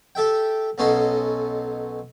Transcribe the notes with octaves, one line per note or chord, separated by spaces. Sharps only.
G4 A4 E5 G5
B1 B2 C#4 D#4 A4 C6